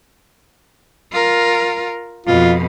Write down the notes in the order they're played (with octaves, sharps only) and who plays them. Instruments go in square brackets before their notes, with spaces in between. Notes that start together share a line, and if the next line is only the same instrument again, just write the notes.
[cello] F4 A#4
[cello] F2 B2 [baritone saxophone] F4